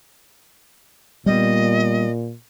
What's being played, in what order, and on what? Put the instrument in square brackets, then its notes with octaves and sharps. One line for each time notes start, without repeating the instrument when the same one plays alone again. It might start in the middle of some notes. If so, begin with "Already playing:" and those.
[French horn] A#2 [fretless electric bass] G3 G#3 B3 [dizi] D#5